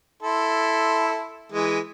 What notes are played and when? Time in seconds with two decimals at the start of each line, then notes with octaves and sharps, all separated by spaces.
0.23 E4 A4 C6
1.52 E3 G#3